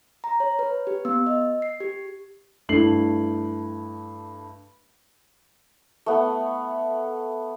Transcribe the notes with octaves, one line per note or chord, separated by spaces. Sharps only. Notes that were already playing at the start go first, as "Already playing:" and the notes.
A#5
C#5
B4
G4
B3
D#5
C7
G4
G2 A3 E4 C7 F#7
A3 B3